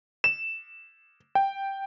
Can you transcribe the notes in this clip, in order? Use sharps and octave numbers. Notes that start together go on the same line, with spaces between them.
E7
G5